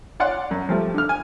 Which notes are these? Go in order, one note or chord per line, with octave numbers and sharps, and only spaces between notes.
C#5 D5 F#5 C6
F#2
F3 G3 A3
D3 F6
G#5